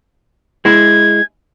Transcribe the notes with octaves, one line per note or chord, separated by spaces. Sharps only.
G#3 E4 G#6